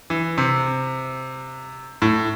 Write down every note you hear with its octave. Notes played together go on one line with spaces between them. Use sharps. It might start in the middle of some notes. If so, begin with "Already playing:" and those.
E3
C3
A2